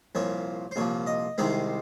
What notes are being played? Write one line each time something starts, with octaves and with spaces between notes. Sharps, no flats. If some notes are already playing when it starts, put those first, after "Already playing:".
C2 A#2 F3 C#5
C5
C2 A#2 F3 C#5
D#5
C2 C3 D#3 G#3 C4 C5